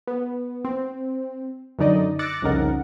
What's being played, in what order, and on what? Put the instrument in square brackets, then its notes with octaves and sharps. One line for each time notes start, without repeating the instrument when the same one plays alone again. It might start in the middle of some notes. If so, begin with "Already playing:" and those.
[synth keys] B3
C4
F#2 D3 D#4 D5 D#5
D6 E6 F#6 A6 A#6 C#7
C2 F2 C#3 D#4 A#4 F#5